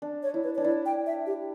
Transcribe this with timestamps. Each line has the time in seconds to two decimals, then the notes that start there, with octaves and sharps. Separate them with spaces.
0.02 D4
0.23 C#5
0.34 E4
0.44 B4
0.55 D4 C#5
0.64 E4 D5
0.86 G5
1.06 E5
1.26 G4